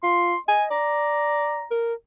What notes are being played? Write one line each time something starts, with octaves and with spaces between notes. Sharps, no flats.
F4 C6
D#5 G#5
D5 A#5
A#4